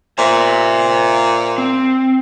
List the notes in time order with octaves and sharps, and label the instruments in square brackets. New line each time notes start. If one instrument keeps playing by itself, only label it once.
[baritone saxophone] A#2 [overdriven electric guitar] C5 E5
[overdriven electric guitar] C4